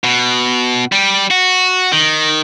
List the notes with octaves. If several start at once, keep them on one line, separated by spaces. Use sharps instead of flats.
B2
G3
F#4
D#3